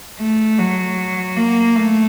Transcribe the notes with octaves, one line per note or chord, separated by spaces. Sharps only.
A3
F#3
A#3
A3